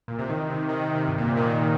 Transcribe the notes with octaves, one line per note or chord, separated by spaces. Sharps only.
A#2
C3
D#3
C3
D#3
D#3
C3
G2
A#2
C3
D#3